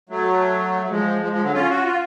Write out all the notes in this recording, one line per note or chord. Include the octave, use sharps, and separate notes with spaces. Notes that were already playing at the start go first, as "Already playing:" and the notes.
F#3 A3
F#3
F3 G#3
F3 G#3
F3 G#3
D3 F#3
C#4 F4
F#4
F4